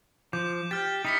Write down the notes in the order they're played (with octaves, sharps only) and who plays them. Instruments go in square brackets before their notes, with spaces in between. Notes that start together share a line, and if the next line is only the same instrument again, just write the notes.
[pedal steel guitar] F3 [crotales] D6 G6
[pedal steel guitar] G4 [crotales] F6 G6 A6
[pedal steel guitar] D#4 E4 [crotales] D#6 B6 C#7